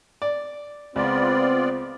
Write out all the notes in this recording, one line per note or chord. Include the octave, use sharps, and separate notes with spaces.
D5
C#2 B3 C4 F4 D5